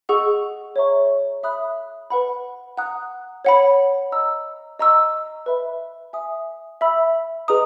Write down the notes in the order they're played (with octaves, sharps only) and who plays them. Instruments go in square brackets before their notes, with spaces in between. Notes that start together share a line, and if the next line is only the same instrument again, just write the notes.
[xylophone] G#4 D#5 F#5 C#6 E6
C#5 E5 A#5 C#6
E5 B5 D#6 F#6
B4 F#5 B5
F#5 A#5 D#6 F#6
C#5 F#5 B5
D#5 A#5 E6
D#5 A#5 C#6 E6
B4 E5 B5
E5 G#5 D#6
E5 B5 E6
G#4 B4 D#5 A#5 D#6